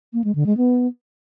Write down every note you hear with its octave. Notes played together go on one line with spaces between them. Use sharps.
A#3
G#3
D3
G#3
B3